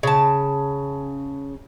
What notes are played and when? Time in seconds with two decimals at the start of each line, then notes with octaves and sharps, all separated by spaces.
0.03 C#3 A5